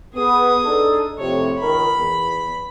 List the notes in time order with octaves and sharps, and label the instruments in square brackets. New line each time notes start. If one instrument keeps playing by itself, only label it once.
[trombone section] B3 [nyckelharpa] G#4 D#6
[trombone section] D4 D#4 A4
[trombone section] F2 A2 C3 [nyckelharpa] C#5
[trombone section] C#2 D#3 A#4 [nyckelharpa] B5
[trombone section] E2